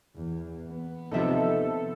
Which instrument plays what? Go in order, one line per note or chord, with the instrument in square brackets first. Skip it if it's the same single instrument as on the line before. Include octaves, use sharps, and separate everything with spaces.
[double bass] E2
B3
[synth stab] D#2 C3 F3 [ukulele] D#4 E5 [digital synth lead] A4